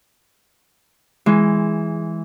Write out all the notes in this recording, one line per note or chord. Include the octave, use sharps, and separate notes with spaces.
E3 G#3